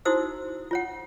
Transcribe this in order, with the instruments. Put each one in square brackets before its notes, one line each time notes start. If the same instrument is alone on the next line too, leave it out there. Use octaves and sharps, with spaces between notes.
[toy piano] D#4 E4 F#4 C5 D#6 E6
F4 C#5 F#5